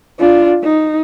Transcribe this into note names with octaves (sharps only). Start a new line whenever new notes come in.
D4 F4
D#4